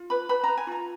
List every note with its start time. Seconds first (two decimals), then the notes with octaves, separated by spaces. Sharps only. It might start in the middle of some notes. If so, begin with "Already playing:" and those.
Already playing: F4
0.10 B4 B5
0.29 B4 B5
0.44 B4 A#5
0.57 G#5
0.67 F4 A#5